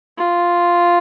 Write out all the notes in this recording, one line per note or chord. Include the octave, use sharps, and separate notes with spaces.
F4